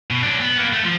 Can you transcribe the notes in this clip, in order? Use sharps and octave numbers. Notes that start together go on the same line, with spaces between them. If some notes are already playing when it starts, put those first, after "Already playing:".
B2
F#3 D4
B3
A#3 B3
A3
F3